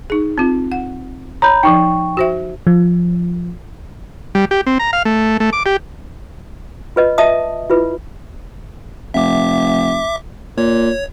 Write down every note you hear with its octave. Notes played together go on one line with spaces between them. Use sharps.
D#4 G#4
C4 F4
F#5
C#5 A#5 B5 G6
F3 D#4 G5 C#6
F#4 C5 E5
F3
G3
G4
C4
A#5
F5
A3
A3
D6
G4
F4 B4 D#5
D#5 E5 A5 D#6
E4 F4 B4
F1 E5 D6
A#2 C#5